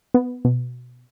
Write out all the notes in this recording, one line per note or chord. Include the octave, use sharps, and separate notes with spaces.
B3
B2